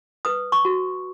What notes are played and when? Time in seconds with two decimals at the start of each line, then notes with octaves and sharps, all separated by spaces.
0.25 B4 D#6
0.52 C#6
0.65 F#4